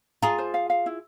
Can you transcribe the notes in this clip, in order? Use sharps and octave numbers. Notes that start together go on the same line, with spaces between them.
F4 G#4 A#5
C5
F5
F5
E4